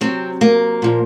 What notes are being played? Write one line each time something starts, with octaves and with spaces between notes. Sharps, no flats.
C3 F#3 C4
A#3
A#2 F3